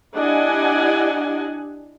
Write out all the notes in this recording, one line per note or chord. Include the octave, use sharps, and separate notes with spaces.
D4 E4 G4 D#5 F#5 G#5